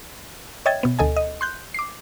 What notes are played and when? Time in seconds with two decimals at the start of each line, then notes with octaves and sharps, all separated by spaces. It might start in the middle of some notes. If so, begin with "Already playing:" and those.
0.66 C#5 D#5 E5 G5 G#6 A6
0.83 B2 B3
0.99 D2 A4 D#5 G#5
1.16 D#5
1.41 C6 F#6 G6
1.74 D6 C7